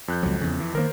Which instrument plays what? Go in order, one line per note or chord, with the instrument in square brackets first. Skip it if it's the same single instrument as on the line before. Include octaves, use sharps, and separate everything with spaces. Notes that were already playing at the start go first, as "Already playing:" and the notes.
[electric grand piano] F2 F#6 G6
[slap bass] C#2 F#3
E2 C#3
E3
[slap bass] D#3 G3 A#3 [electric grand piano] A#4 C5